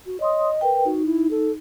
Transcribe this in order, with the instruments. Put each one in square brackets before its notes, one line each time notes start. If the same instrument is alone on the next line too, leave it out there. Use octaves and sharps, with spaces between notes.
[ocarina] F#4
[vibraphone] C#5 C6 D#6 [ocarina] D#5
[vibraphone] A#4 B4 G5
[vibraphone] D#4 [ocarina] F#4
[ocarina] E4
A4